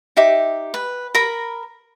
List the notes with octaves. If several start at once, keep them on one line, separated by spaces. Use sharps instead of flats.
D#4 G4 E5 D6
B4
A#4 A#5 B5